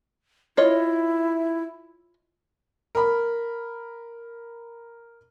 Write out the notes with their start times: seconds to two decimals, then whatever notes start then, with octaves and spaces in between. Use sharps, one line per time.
0.57 E4 F4 C#5 D#5
2.95 A#4 B5